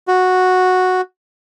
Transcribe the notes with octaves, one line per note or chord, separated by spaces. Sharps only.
F#4